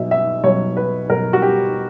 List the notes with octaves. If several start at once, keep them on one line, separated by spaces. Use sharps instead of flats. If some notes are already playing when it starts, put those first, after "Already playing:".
Already playing: B2 F#3 E5
E5
B2 F#3 C#5
B4
B2 F#3 A#4
F#4
G4